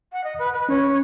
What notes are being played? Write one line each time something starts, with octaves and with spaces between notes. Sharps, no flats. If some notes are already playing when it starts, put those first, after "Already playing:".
F#5
D#5
B4
B4
C#4 C#5